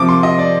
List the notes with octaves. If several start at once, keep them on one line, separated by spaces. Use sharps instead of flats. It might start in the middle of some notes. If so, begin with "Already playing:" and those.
Already playing: C3 F3 D6
C6
D#5
D5